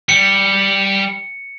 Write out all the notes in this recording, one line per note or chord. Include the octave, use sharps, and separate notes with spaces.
G3 C#7